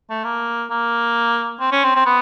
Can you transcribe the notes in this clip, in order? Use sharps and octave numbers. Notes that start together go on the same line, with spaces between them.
A3
A#3
A#3
C4
C#4
C4
C4
B3